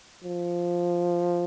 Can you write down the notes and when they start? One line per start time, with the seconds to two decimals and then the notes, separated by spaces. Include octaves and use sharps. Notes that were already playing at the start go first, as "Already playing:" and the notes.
0.24 F3